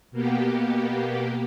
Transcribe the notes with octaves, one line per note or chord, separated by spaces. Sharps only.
B2 A#3 B3 G4